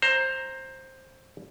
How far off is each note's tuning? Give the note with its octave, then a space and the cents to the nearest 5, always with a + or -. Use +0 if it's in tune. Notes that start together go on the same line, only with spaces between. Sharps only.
C5 +15 A#5 +0